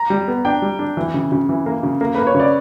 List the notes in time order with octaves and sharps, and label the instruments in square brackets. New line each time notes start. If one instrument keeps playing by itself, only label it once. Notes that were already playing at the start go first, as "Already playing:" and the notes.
Already playing: [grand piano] A#5
[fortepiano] G3
B3
[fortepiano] D4 [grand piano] G5
[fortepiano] G3
D4
E3
C#3
C#3
E3
A#3
C#3
A#3
[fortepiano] A#3 [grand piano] B4
[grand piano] C#5
[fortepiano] C#3
[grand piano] D5